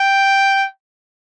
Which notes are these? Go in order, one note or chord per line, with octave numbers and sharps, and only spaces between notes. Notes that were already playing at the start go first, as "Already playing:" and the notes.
Already playing: G5